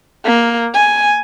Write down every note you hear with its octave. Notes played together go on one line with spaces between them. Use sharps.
A#3
G#5